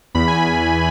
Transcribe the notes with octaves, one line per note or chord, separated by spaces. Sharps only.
E2 B5
G#5